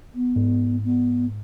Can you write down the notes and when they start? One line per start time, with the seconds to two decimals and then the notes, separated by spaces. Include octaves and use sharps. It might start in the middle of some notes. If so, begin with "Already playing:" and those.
0.14 B3
0.36 G#2
0.84 B3